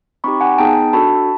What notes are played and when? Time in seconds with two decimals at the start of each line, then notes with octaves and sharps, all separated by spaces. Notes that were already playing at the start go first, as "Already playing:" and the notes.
0.24 C4 D#4 G4 B5 C#6
0.41 F#5 G#5
0.58 B3 D#4 G#4 G5 A5
0.93 D4 F#4 A4 A5 B5